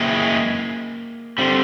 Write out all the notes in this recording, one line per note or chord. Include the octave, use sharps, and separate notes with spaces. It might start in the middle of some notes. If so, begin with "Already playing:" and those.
Already playing: F#2 C#3 E3 G#3 A#3 C4
D3 G3 C4